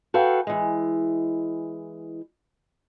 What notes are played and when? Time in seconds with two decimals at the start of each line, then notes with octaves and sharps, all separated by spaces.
0.14 F#4 A4 B4 F5 G5
0.47 E3 G#3